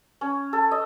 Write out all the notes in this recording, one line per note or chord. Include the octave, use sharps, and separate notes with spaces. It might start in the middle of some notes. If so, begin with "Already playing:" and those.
C#4
A4
D#5